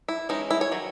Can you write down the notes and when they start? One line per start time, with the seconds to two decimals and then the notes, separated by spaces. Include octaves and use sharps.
0.08 E4
0.29 E3 G#3 C#4 D#4
0.51 E4
0.61 C#5
0.72 D#3 F#3